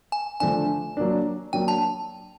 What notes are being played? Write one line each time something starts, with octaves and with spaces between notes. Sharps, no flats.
G#5
D3 F3 A3 D4 G#5
F#3 A#3 D4
F#3 A#3 D4 G5
A5